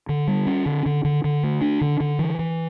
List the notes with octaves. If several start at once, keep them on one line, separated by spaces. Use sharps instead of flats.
D3
G3
C#4
D3
D3
D3
D3
A3
D4
D3
D3
E3
E3